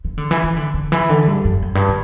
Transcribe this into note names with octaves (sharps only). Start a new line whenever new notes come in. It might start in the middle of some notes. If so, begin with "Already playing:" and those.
E3
D3
E3
E3
D3
D3
E3
D3
G2
F#2
F#2
G2
D3